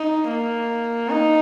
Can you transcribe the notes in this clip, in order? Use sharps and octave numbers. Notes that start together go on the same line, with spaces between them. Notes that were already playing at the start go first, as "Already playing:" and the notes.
Already playing: D#4
A#3
D#4